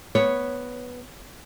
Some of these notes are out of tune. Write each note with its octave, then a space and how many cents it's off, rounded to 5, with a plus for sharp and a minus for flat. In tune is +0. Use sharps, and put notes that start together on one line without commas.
B3 +0 C#5 +0